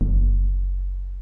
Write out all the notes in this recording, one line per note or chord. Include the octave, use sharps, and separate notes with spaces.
F#1